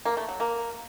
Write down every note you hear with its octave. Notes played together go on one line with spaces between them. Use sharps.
A#3
A3
F#3
A#3